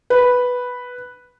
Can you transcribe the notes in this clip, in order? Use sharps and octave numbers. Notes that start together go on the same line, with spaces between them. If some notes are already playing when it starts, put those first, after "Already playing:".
B4